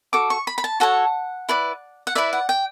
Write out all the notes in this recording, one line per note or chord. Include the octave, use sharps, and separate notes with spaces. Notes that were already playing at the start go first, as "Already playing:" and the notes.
F#4 A4 D6
C#6
B5
B5
A5
F#4 A4 C#5 F#5
E4 B4 D5
F#5
E4 B4 D5 E5
F#5
G5